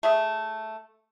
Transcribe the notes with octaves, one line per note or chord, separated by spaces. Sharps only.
A3 G#4 E5